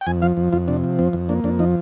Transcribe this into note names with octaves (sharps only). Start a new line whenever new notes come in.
G5
F2 G#5
F3 F5
F2
F2 F4
C3 D4
F3
F2 C4
F2
A#3 D4
F2 D4
F3 D#4